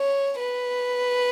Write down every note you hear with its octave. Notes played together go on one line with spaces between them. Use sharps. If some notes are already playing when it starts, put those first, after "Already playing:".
Already playing: C#5
B4